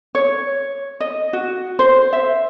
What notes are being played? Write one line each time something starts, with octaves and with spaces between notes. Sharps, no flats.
C#5
D#5
F#4
C5
E5